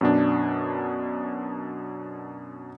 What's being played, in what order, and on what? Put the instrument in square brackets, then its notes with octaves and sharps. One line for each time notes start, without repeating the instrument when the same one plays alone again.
[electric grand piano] F#2 B2 D4